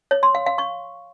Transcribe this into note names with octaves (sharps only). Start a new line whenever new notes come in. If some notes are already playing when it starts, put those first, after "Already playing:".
C#5
C6
F5
F5
C#6